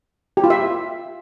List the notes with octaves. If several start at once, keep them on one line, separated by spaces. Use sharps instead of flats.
G4
F4
E5